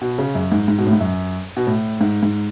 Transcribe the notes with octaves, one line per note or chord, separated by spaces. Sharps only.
B2
C#3
F#2
G#2
G#2
B2
A2
G#2
F#2
B2
A2
G#2
G#2